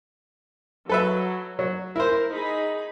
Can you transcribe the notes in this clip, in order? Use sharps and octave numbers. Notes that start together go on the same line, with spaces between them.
F#3 A4 B4 E5
F#3
E4 A#4 C5
D#4 G#4 B5